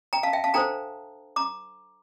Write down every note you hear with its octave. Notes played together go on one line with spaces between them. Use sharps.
G5 A#5
F5 A5
E5 G5
F5 A5
D4 A4 C5 G5 A#5
A#5 D6